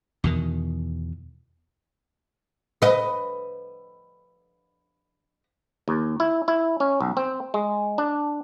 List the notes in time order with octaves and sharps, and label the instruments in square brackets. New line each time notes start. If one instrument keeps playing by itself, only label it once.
[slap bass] E2 B2 D#3
[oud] B4 D#5
[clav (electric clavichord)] D#2
E4
E4
C#4
B1
C4
G#3
D4